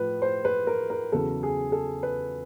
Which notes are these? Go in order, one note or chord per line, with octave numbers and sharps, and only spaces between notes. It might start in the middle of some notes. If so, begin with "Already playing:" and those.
Already playing: A2 F3 B4
C5
B4
A#4
A#4
E2 C#3 F#3 A4
G#4
A4
B4